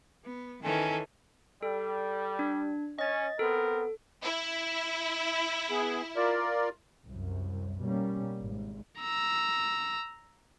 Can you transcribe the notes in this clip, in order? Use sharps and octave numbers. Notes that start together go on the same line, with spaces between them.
B3
D#3 E3 C#4 A4 G#5 G#6
G3 A4
D4
C#4 D#5 A6
B3 C4 A4 A#4
E4
B3 G#4
F4 A#4 D5
C2 F#2
B2 G3 A#3 C#4
G#1 G#2
A#5 E6